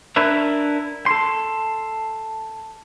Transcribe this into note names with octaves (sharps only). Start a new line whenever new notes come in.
D4 E4 A#4 B4 E5
A4 C6